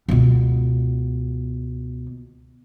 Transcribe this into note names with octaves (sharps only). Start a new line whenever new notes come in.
C#2 B2